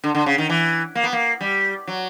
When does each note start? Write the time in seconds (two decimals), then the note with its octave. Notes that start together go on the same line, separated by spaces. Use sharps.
0.04 D3
0.15 D3
0.26 C#3
0.38 D#3
0.49 E3
0.95 A#3
1.03 B3
1.13 A#3
1.41 G3
1.87 F#3